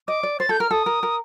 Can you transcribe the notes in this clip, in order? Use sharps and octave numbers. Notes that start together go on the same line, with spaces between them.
D#5 D6
D5
C5 A6
A4 G6
A#4 F6
A4 D#6
A#4
A#4